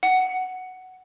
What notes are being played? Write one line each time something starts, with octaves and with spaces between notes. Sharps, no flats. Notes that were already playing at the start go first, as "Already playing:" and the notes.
F#5